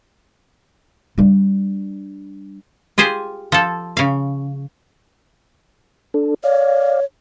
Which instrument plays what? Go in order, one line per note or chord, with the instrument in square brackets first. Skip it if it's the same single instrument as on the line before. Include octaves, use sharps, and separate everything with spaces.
[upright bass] G3 D4
[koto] F4 G4 G#4 C5
F3 A4
C#3 F5
[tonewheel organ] D4 A4
[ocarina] C#5 [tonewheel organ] D5 F5